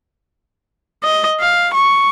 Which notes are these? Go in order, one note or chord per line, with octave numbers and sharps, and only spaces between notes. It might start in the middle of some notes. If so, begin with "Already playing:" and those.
D#5
F5
C#6